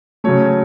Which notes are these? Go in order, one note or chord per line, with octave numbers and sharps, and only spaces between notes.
C#3 F#3 A3 C#5